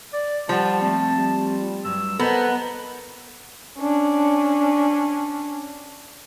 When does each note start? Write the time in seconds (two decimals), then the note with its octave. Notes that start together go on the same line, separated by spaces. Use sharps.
0.13 D5
0.49 F3 G3 C5 F#5 A5
0.82 A3 C4
1.17 G3
1.85 G2 F#3 E6
2.20 B3 A4 A#4 C5 D#5 A#5
3.79 C#4 D4